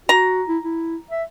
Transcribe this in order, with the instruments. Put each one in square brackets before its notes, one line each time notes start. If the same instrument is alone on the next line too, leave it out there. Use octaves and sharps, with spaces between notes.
[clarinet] F#4 [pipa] A#5
[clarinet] E4
E4
E5